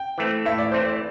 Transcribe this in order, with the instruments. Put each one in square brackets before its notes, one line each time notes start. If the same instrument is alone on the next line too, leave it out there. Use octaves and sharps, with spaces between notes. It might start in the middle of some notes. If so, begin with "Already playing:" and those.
Already playing: [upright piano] G5
[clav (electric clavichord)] E3 A3 C4
[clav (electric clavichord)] A2 [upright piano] E5
[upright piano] D5
[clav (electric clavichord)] E3 A3 C4 [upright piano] C5
[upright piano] D5